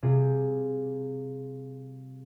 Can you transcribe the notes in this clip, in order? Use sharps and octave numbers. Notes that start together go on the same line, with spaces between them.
C3 G3 C4 F4 G#4